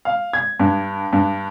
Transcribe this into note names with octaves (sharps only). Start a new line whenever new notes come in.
F5
G#6
G2
G2